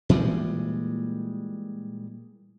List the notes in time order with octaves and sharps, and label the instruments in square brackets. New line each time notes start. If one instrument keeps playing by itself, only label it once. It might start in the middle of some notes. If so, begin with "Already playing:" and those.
[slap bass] A#2 E3 G3 G#3